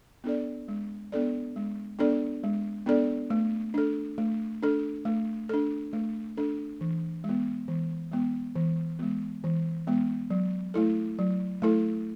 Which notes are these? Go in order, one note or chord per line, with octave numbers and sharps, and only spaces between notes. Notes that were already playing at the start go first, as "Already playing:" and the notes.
B3 D4 A4 D5
G#3
B3 D4 A4 D5
G#3
B3 D4 A4 D5
G#3
B3 D4 A4 D5
A3
D4 A4
A3
D4 A4
A3
D4 A4
A3
D4 A4
E3
G#3
B3
E3
G#3 B3
E3
G#3 B3
E3
G#3 B3
F#3
A3 E4 A4
F#3
A3 E4 A4